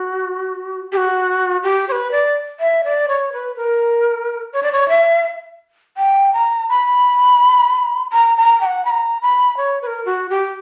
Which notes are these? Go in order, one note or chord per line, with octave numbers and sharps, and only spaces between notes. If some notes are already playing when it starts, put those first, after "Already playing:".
Already playing: F#4
G4
F#4
G4
C#5
B4
D5
E5
D5
C#5
B4
A#4
C#5
D5
C#5
E5
G5
A#5
B5
A#5
A#5
G5
F#5
B5
A#5
B5
C#5
B4
A#4
F#4
G4